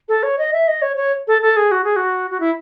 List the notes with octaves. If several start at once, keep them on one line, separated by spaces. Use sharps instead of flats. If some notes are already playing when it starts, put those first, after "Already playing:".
A4
C#5
D#5
E5
D#5
C#5
C#5
A4
A4
G#4
F#4
G#4
F#4
F#4
E4